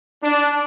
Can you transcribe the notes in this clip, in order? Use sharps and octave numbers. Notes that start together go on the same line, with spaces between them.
D4